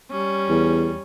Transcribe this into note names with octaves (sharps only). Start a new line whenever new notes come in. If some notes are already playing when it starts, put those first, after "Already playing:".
G3 C#4
E2